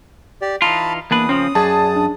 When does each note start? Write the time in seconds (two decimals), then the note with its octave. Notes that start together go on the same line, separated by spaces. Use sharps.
0.42 G4 D5
0.62 E3 D#4 F4 A5 B5
1.11 E2 A#3 D4 B4 D#6
1.29 C#3 F3 C4 C#4
1.55 F#2 G#4 D5 A5
1.96 D4